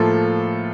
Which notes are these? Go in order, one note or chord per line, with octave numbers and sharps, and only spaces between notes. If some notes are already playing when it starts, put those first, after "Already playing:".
Already playing: A2 F3 A#3 F4 A4